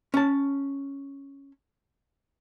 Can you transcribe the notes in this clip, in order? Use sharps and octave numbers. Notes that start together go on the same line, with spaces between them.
C#4 A5